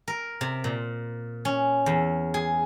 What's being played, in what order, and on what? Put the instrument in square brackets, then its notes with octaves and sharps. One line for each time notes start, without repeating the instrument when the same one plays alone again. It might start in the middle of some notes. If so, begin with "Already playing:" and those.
[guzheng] A#4
C3
A#2
C#4
E2
G#4